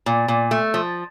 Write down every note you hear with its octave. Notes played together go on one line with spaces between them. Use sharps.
A#2
A#2
A3
F3